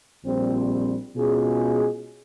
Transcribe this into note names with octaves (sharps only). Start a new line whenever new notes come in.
A#1 A#2 G3 C4
B2 G#3 C#4 F4 G#4